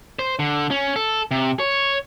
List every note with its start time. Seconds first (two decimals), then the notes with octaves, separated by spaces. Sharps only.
0.19 C5
0.39 D3
0.71 C#4
0.96 A4
1.31 C3
1.60 C#5